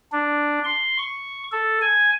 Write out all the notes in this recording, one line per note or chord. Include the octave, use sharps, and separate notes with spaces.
D4
C6
C#6
A4
G#5